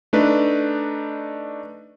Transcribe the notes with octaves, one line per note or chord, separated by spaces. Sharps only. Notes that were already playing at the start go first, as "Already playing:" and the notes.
A3 D4 D#4 B4